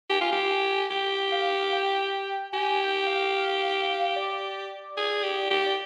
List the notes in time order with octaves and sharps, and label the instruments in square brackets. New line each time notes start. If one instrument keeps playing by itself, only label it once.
[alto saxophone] G4 [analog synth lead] G#5
[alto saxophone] F4
G4
[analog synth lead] G#5
[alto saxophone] G4 [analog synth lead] G5
[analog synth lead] F5
G5
[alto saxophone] G4 [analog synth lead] G#5
[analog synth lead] G5
F5
D5
[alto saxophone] G#4
G4
G4
[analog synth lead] D5